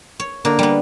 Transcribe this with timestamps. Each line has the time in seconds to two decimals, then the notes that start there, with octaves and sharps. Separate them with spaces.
0.20 C#5
0.45 D3 A#3
0.59 G3 B3